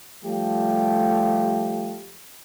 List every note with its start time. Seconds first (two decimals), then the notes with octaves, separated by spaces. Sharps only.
0.24 F3 G3 A3 G4